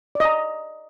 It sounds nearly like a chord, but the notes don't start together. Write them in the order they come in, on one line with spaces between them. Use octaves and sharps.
D5 D#5 A#5